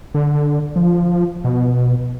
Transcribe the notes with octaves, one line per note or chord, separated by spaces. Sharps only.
D3
F3
B2